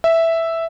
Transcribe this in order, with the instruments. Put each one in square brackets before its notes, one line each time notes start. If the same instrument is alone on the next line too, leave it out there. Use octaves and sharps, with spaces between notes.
[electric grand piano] E5